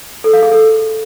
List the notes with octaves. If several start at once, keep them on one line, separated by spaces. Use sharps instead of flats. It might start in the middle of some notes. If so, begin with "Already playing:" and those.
A4
F5
G#4
A4